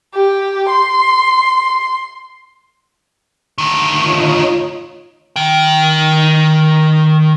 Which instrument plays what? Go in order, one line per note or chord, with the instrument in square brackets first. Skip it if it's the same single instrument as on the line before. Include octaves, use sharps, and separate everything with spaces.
[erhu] G4
C6
[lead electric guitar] D2 D#3
[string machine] F4 C#5 D#5
[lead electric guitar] D#3 G5